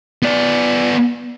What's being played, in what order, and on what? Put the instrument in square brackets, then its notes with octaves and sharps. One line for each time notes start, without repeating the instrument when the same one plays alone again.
[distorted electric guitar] B3 D5